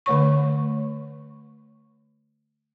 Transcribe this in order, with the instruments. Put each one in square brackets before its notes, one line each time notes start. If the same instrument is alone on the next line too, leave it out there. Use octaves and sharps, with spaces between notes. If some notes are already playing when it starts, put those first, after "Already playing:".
[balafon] D3 A3 C#5 C#6